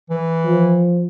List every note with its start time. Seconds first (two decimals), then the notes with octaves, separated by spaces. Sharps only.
0.10 E3
0.45 F3